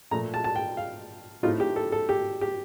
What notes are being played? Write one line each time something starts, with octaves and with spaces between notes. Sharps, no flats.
A#2 F3 A3 A#5
A5
A5
G5
F5
A2 A3 C4 D#4 F4
G4
A4
A4
G4
G4